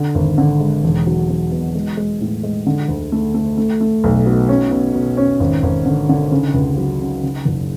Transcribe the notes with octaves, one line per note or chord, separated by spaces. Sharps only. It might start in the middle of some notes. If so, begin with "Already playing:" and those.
Already playing: D3
G#1
D3
G#3
E1
F#3
F#3
B2
G#3
G#3
A2
G#3
D3
D2
A3
A3
A3
A3
B1
B2
C#4
B2
B2
C#4
G#1
G#1
D3
D3
C#3
C#2
F#3
C#3
C#3
F#1